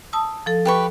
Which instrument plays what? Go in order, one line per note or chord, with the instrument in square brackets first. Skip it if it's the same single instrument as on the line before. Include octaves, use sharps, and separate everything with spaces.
[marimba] A5 D#6 E6
F3 A4
[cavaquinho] G4 B4 C#6